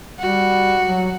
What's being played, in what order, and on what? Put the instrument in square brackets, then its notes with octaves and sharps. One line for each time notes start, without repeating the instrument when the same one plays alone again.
[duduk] G3 [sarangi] F#4
[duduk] F#3